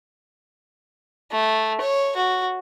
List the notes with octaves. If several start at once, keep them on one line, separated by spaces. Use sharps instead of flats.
A3
C#5
F#4